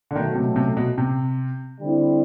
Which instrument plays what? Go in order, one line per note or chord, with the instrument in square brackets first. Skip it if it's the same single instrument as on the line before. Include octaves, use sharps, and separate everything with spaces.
[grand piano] D3
[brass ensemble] B2 F#3 A3 [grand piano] D#3
[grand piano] C3
C3
B2
C3
[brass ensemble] D3 G3 C4 E4